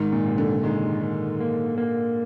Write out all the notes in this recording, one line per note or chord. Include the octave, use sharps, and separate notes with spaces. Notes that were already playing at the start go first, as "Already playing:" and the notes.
Already playing: G#2 D#3
A#2
C3
D3
D#3 G#3
D#3
A#3
A#3